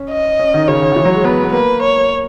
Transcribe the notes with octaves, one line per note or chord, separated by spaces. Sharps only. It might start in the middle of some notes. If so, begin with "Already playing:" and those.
Already playing: C#4
D#5
C#4
D#3
C#3 C#5
D#3
D#3
E3
F#3
G#3
B3 B4
B3
A#3 B4
C#5